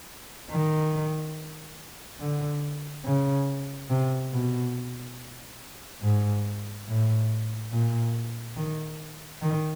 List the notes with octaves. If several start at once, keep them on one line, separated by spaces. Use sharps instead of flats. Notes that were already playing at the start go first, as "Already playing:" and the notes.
D#3
D3
C#3
C3
B2
G#2
A2
A#2
D#3
D#3